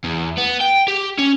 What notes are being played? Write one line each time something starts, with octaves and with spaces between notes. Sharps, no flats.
E2
B3
G5
G4
C#4